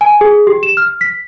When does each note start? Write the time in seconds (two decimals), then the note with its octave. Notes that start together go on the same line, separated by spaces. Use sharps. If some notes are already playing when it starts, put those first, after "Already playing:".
0.01 G#5
0.21 G#4
0.47 G4
0.63 E7
0.77 F6
1.01 B6